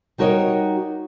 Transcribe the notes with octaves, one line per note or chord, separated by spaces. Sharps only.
G3 D#4 F#4 A#4 C#5 D#5